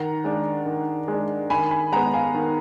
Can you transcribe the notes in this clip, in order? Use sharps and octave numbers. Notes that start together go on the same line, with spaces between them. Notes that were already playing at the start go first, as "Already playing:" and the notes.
Already playing: D#3 F#5 A#5
G#3 D4
D#3
G#3 D4
D#3 G#5 B5
G#5 B5
G#3 B3 F#5 A#5
F5 G#5
D#3